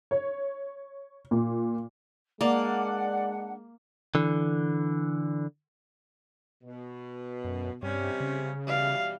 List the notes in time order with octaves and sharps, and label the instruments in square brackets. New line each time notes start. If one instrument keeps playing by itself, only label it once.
[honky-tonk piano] C#5
A#2
[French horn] G#3 [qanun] A#3 [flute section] D4 F#5 [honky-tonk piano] D5
[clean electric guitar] D3 E3
[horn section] B2
[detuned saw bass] F#2
[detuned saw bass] G2 [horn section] C3 G3 [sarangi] C#4
[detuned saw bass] C#3
[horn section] B2 E3 G3 [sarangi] F5